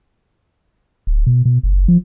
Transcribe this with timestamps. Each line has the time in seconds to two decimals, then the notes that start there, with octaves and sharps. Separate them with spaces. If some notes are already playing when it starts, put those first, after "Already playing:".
1.07 D1
1.27 B2
1.45 B2
1.63 F#1
1.88 F3